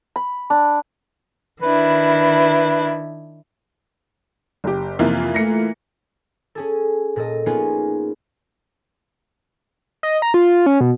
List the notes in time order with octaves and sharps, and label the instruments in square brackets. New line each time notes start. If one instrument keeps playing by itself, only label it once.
[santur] B5
D4
[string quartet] D#3 D4 E4 [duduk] B4
[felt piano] F#1 G4
[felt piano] F2 C3 [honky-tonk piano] E3 A#3 F4
[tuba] A3 [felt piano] A#6 C#7
[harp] C#4 G#4 A4
A#2 A4 D#5
A#3 B3 C#4 D#4 F4 G#4
[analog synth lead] D#5
A#5
F4
C#4
B2